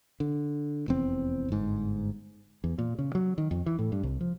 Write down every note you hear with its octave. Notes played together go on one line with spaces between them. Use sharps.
D3
F1 E2 C4
G1 G#2
E2
A#2
C#3
F#3
D#3
F2
E3
A2
G2
C2
F3